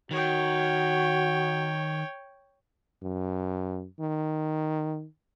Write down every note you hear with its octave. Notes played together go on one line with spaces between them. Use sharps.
D#3 F#4 C#5 G5
F#2
D#3